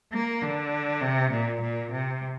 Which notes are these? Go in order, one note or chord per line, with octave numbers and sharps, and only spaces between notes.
A#3
D3
C3
A#2
A#2
C3